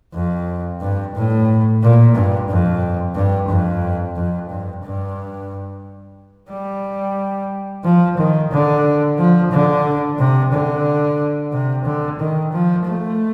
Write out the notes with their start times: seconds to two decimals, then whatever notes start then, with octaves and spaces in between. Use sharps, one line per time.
0.14 F2
0.81 G2
1.15 A2
1.82 A#2
2.15 G2
2.49 F2
3.16 G2
3.49 F2
4.15 F2
4.50 G2
4.83 G2
6.50 G3
7.84 F3
8.17 D#3
8.51 D3
9.18 F3
9.52 D3
10.19 C3
10.52 D3
11.52 C3
11.85 D3
12.19 D#3
12.52 F3
12.85 A3